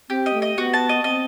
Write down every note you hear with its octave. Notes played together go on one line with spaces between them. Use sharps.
C4 G4
D#5
A3
D#5
B3 F#4
A5
D#5
C4 D#5